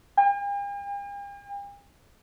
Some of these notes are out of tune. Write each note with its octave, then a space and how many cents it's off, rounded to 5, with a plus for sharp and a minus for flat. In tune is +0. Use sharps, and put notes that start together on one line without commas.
G5 +45